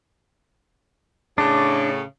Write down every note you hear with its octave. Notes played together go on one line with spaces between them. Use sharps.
A2 C#3 D4